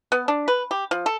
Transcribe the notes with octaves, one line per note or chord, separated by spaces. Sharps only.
B3
D4
B4
G4
F3
A4